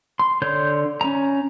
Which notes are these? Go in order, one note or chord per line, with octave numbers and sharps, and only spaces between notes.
C6
D3 C#5 C6 G6
C#4 A#5